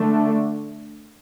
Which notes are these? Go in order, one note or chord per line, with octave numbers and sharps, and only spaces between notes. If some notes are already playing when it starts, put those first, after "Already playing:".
Already playing: D3 A3 D4